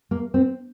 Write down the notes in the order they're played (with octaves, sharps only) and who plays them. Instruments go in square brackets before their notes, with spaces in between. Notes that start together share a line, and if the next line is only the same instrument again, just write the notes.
[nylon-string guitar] A#3
C4